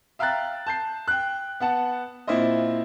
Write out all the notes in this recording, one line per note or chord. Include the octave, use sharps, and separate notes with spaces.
E5 F5 G5 A#5 F#6 A6
A5 G6 C7
G5 F#6
B3 F#5 A5
A#2 C4 E4 F4 C5 D#5